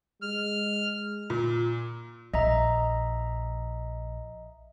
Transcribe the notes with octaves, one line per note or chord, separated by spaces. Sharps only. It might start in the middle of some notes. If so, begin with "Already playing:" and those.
G#3 F6
A#2
A#1 D#5 E5 A#5